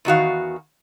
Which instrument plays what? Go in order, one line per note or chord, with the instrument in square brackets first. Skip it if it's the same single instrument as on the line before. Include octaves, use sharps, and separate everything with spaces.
[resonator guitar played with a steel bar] E2 D#3 F#4 F5